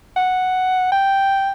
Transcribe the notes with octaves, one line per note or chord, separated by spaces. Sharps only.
F#5
G5